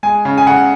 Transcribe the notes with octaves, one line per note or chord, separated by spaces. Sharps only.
G#3 G#5
C#3
G#5
C#3 F#5